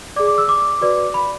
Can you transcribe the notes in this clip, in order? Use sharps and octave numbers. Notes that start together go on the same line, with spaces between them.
G#4 D5 D6
D6
E6
D6
F#4 B4 D5
B5